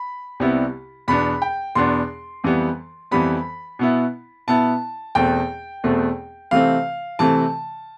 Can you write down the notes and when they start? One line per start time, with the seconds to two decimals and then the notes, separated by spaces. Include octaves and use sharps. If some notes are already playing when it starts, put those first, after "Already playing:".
Already playing: B5
0.40 C2 C3 G3 B3 E4
1.08 E2 B2 B3 D4 B5
1.42 G5
1.75 E2 B2 B3 D4 C6
2.44 F2 E3 G3 B3
3.11 F2 E3 G3 B3 B5
3.79 B2 B3 E4
4.48 B2 B3 E4 A5
5.15 E2 B2 A3 C4 G5
5.84 E2 B2 A3 C4
6.51 C3 E3 A3 C4 F5
7.19 C3 E3 A3 C4 A5